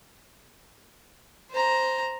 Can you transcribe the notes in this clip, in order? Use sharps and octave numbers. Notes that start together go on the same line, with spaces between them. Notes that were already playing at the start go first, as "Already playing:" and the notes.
C5 A#5